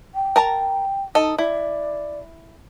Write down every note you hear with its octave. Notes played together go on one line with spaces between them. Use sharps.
G5
A#4 A5 A#5
D#4 A4 D#5
E4 D5